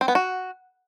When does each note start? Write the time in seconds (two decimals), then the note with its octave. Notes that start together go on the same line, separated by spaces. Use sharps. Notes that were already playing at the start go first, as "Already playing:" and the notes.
0.01 C4
0.08 B3
0.15 F#4